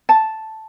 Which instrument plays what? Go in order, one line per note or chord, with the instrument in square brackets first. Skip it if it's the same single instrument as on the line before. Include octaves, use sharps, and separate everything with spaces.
[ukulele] A5